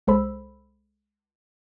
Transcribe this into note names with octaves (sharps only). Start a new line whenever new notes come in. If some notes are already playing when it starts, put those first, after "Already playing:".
C2 G#3 A4 C5 B5 E6